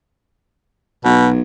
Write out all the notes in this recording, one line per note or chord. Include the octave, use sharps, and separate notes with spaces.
B1 B2